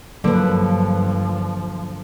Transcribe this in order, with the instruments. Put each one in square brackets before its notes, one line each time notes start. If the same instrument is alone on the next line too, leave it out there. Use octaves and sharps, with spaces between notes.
[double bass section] G2 [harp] D3 [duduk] F3 [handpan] F#3 A#3 B4